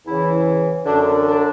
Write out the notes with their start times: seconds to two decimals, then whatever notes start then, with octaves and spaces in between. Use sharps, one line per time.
0.06 E2 C#3 E3 E4
0.85 F#2 D3 D4
1.25 D4